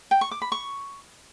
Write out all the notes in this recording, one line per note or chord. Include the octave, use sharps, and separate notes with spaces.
G5
C#6
D6
B5
C#6